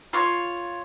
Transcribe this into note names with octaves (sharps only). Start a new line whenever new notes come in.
F4 C#5